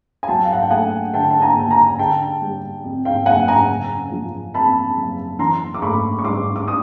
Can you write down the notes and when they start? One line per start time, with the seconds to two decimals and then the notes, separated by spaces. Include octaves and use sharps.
0.23 G#5
0.28 F#3 G5 A5
0.44 F5
0.53 F#5
0.61 G5
0.70 A3 F#5 G#5
1.14 D3 G5 A5
1.31 A5
1.42 G#5 A#5
1.56 D#2
1.71 G#5 A#5
1.99 D3 G5 A5
2.41 G3
2.84 F2
3.05 F5 G5
3.26 F#1 F#5 G#5
3.48 G#5 A#5
3.69 C#3
4.12 F3
4.54 F2 A5 B5
4.97 F#1
5.39 E3 A#5 C6
5.74 D6
5.82 A3 B5 C#6
6.19 C#6
6.24 G2 C6 D6
6.56 D6
6.67 C#6 D#6